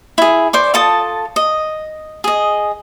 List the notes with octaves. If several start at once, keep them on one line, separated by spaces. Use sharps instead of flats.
E4 G#4
C5 D5 C#6
F4 A4 A5 D#6
D#5
G#4 D#5